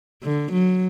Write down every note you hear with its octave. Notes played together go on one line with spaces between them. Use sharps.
D3
F#3